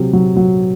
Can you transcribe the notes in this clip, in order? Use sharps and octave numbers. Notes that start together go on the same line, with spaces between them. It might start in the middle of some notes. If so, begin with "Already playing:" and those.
Already playing: C3 F#3
F#3
F#3